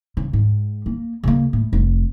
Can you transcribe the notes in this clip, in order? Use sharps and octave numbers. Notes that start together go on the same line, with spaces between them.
C#3
G#2
A#3
C#3 A#3
A2
F1